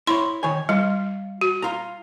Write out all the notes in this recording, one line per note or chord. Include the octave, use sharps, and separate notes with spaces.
E4 C#5 C6
D#3 C#5 G#5
G3 F4
F#4
F4 A#5